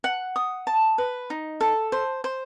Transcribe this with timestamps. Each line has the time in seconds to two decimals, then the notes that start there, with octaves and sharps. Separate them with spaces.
0.04 F#5
0.36 D#6
0.67 A5
0.98 B4
1.30 D#4
1.61 A4
1.92 C5
2.24 C5